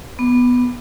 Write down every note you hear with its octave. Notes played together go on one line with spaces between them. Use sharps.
B3